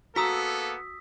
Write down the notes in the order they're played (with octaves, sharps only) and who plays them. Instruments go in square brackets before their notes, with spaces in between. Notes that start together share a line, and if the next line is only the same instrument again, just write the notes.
[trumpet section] A#3 B3 A4 [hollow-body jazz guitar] F#4 A#5 [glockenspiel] D#6 E6 B6